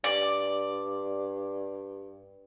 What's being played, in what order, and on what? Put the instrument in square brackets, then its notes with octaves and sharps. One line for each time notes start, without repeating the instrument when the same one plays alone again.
[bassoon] G2 [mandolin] D5